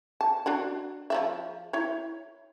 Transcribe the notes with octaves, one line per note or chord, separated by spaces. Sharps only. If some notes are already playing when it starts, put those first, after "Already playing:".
A5
D4 F#4 D5
F3 D5 E5
E4 C#5